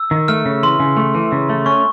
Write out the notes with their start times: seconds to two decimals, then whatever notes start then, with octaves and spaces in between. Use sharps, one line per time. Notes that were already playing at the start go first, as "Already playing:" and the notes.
Already playing: E6
0.11 D#3
0.28 A3 F6
0.46 C#3
0.63 E3 C6
0.80 C#3
0.97 A3
1.15 E3
1.32 C#3
1.50 A3
1.66 C#4 C#6